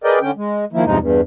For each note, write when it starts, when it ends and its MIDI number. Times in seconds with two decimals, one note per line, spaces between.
0.04 0.19 68
0.04 0.19 70
0.04 0.19 71
0.04 0.19 74
0.04 0.19 75
0.04 0.19 79
0.21 0.31 50
0.21 0.31 61
0.21 0.31 79
0.36 0.65 56
0.73 0.85 51
0.73 0.85 53
0.73 0.85 58
0.73 0.85 64
0.85 0.98 40
0.85 0.98 43
0.85 0.98 48
0.85 0.98 53
0.85 0.98 56
0.85 0.98 63
0.98 1.21 40
0.98 1.21 43